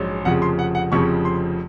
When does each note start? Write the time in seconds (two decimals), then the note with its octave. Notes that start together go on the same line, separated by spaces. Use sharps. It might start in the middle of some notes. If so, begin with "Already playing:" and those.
Already playing: A#1 G#2 F#3 C#4
0.25 F1 F2 C#3 F3 F#5
0.42 C6
0.59 F#5
0.75 F#5
0.92 F1 F2 C#3 F3 C#6
1.25 C6